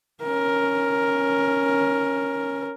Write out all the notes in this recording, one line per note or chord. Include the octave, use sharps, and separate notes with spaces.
C#4 A#4